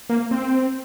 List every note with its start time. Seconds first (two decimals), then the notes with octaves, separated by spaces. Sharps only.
0.09 A#3
0.31 C4